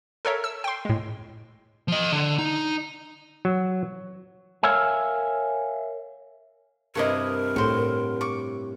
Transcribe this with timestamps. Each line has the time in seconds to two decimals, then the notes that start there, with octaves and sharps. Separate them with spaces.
0.25 A4 A#4 C#5 E5
0.44 E6
0.64 G5 C6
0.85 A2 G#3
1.88 F3 D#5
2.13 D3
2.38 D#4
3.45 F#3
4.63 A#4 C#5 E5 F5 G#5
6.95 G2 C3 E4 A#4 D#5 C#6
7.56 A2 F#4 A4 C5
8.21 C#6 D6